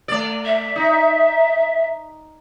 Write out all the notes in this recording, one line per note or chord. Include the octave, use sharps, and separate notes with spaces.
A3 D5
E5
D#4